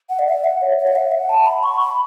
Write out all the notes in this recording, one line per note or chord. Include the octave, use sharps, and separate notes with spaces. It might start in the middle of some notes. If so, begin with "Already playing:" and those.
F#5
D5
E5
F#5
C#5
C#5
F#5
E5
F#5
A5
B5
C#6
B5